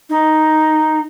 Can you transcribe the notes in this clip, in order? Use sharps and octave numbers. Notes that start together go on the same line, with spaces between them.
D#4